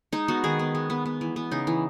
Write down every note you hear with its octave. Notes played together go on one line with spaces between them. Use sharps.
G#3 D#4
B3 F#4
D#3 G#4
B3
G#3
B3
B3
E3
B3
C#3 D#4
E3